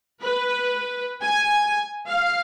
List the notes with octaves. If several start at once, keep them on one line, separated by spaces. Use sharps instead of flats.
B4
G#5
F5